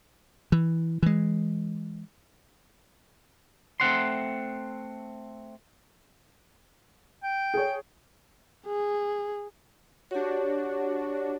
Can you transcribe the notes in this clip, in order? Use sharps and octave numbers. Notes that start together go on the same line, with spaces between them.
E3
E3 G#3
A3 C4 F#5 C6
G5
G#4 C#5
G#4
D4 F#4 G4 C#5